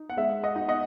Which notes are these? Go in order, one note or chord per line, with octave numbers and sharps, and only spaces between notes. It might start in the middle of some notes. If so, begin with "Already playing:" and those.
Already playing: D#4
F#5
G#3 E5
D#5 F#5
D#4
D#5 F#5